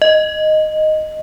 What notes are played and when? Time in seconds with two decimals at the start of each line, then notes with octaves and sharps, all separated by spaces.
0.02 D#5